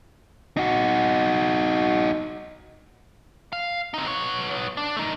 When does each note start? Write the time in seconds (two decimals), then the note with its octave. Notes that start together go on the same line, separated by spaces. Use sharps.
0.57 D#4 F#4
3.53 F5
3.94 C4 D#4
4.06 B3 C#5
4.77 D4
4.97 A3 D#4